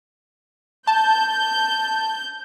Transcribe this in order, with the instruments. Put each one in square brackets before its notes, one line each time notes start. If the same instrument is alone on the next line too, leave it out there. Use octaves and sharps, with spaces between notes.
[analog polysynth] A5 [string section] G6